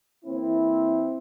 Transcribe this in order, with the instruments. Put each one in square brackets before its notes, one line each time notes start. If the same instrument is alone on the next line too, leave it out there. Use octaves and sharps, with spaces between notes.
[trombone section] E3 A#3 C4 E4